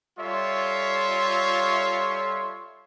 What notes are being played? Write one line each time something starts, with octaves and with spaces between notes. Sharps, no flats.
G3 F4 A4 C#5 E5 C6